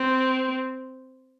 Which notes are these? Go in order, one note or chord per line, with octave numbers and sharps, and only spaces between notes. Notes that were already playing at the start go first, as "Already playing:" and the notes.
Already playing: C4